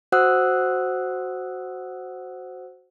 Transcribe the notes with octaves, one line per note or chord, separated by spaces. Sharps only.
F#4 C5 F#5 D#6 E6 F#6